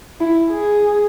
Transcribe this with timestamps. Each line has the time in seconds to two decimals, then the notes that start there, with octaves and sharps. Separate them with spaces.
0.20 E4
0.51 G#4